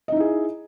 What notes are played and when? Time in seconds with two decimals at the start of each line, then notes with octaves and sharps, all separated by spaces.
0.08 D#5
0.12 D#4
0.16 E4
0.20 G#4